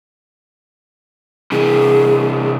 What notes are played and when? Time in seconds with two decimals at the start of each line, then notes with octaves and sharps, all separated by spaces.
1.52 C3 E3 G#4